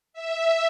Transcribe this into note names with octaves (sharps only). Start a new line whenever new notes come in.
E5